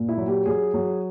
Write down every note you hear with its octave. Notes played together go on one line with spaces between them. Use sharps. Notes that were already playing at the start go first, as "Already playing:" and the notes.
Already playing: A#2
E4
F#3
G4
F#3 G#4
F#3